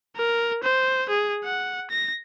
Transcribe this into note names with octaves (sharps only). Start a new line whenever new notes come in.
A#4
C5
G#4
F#5
A#6